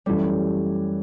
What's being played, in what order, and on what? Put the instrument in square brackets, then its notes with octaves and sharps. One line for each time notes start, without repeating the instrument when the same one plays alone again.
[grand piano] F#2 E3 A3 C#4 [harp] G3